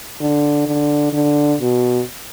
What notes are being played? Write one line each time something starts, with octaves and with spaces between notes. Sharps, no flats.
D3
D3
D3
B2